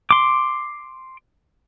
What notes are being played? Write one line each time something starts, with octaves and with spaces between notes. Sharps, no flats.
C6 D6